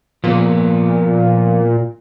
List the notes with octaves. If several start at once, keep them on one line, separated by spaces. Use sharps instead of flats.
A#2 F3 B3